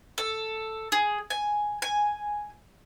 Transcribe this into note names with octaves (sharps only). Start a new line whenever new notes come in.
A4
G#4
G#5
G#5